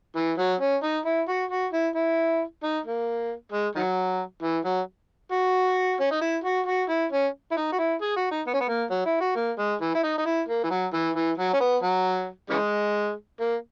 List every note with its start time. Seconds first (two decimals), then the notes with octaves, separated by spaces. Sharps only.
0.16 E3
0.38 F#3
0.60 C#4
0.83 D#4
1.05 E4
1.28 F#4
1.51 F#4
1.73 E4
1.95 E4
2.63 D#4
2.85 A#3
3.52 G#3
3.75 D#3 F#3
4.42 E3
4.65 F#3
5.32 F#4
6.01 C#4
6.11 D#4
6.21 E4
6.44 F#4
6.67 F#4
6.89 E4
7.12 C#4
7.51 E4
7.57 D#4
7.72 F#4
7.79 E4
8.02 G#4
8.16 F#4
8.31 D#4
8.47 B3
8.54 C#4
8.60 B3
8.69 A#3
8.91 F#3
9.06 E4
9.21 F#4
9.36 A#3
9.58 G#3
9.81 E3
9.95 E4
10.03 D#4
10.18 D#4
10.26 E4
10.48 A#3
10.64 E3
10.71 F#3
10.94 E3
11.15 E3
11.37 F#3
11.53 C#4
11.60 B3
11.83 F#3
12.50 C#3 E3 G#3
13.40 A#3